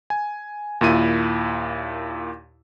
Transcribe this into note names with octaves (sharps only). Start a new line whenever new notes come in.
G#5
D#2 A#2 E4 D#7